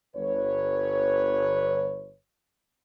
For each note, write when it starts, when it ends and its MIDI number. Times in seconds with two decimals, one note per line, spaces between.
0.15 2.16 31
0.15 2.16 71
0.15 2.16 73